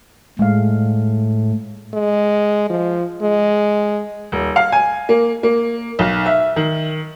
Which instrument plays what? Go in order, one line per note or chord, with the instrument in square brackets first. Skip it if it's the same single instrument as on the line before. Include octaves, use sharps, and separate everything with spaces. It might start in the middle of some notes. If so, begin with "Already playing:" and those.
[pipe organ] A2 [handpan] G#3 F5
[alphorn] G#3
F3
G#3
[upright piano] D#1
F5
G#5
A#3
A#3
B1
E5
D#3